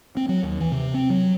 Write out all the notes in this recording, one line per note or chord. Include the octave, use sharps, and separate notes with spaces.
C4
F#3
D#2
E3
C3
C4
F#3